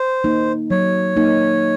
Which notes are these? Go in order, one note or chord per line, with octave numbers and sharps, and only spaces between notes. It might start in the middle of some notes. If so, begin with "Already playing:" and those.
Already playing: C5
A#3 D#4
F#3 C#5
A#3 D#4